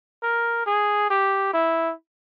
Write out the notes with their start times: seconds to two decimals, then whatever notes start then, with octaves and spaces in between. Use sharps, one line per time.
0.23 A#4
0.67 G#4
1.10 G4
1.54 E4